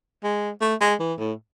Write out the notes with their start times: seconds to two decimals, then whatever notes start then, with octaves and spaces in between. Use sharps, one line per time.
0.24 G#3
0.61 A3
0.81 G#3
1.00 E3
1.19 A2